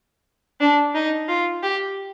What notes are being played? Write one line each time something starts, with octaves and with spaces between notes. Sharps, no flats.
D4
D#4
F4
G4